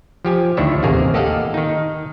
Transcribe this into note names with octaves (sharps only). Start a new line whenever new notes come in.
F3 G4 G#5
D2 D#3 D4 E4 C#5 E5
A1 D#2 C3 A#3 G#4 A#4
A#3 G4 A4 D#5 F5 F#5
D#3 D#4